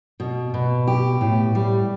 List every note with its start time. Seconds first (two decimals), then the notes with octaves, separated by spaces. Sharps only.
0.20 B2
0.54 B2
0.87 G4
1.21 A2
1.55 G3